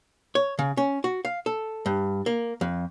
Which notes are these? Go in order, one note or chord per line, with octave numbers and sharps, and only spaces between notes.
C#5
C#3
C#4
F#4
F5
A4
G2
A#3
F2